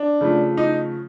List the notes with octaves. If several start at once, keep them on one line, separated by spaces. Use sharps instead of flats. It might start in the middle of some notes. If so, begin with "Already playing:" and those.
Already playing: D4
C#3 F3 A3
D#4